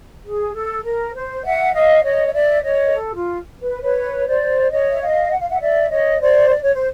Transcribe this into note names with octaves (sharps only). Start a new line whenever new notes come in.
G#4
A4
A#4
C5
E5 F#5
D#5 F5
C#5 D#5
D#5
D5 E5
C#5 D#5
A#4
A4
F4
B4
B4 C#5
C5 D5
C#5 D#5
E5
D#5 F5
F#5
F5
E5 F#5
D5 E5
C#5 D#5
C5 D5
D5
C#5
C5